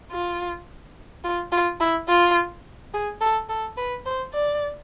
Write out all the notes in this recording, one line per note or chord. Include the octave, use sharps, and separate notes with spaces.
F4
F4
F4
E4
F4
G#4
A4
A4
B4
C5
D5